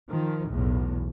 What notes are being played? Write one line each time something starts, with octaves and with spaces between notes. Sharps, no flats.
D#3 F3
B1 E2 A2